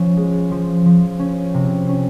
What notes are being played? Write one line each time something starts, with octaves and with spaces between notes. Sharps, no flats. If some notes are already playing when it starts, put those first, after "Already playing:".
Already playing: F3 C#4
G#3
F3
F3
C#4
C3
C#4